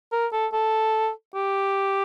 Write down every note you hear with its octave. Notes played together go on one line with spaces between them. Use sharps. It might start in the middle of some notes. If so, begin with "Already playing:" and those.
A#4
A4
A4
G4